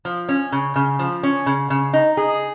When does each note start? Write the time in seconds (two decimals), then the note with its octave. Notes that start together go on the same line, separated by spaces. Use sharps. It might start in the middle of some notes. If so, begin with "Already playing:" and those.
0.05 F3
0.29 C#4
0.52 C#3
0.76 C#3
0.99 F3
1.23 C#4
1.46 C#3
1.70 C#3
1.93 D#4
2.17 G#4